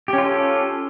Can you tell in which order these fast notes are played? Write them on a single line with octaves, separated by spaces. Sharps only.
G4 C#4 F4 A4